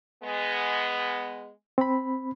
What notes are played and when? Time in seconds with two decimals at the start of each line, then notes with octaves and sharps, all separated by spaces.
0.24 G#3 B3
1.78 C4 B5